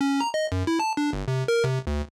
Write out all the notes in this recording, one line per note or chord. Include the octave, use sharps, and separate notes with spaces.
C#4
A#5
D#5
F#2
E4
A5
D4
G1
C3
A#4
C3
D2